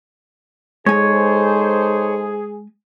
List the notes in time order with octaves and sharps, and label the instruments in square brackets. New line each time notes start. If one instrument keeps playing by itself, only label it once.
[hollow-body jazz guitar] G#3 G#5 [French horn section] D#4 A4 C5 [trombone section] G#4 [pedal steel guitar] C#5